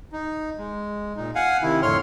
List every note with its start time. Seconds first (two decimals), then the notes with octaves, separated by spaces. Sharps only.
0.12 D#4
0.58 G#3
1.16 A#2 D#4
1.35 F5 F#5 G#5
1.62 C3 D#3 E4
1.82 F2 A2 D3 C#5 C6 F6